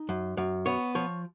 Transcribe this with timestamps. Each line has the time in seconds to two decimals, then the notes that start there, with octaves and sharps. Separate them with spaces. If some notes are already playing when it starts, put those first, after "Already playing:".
Already playing: D#4
0.09 F#2
0.37 F#2
0.66 B3 C#5
0.95 F3 C#5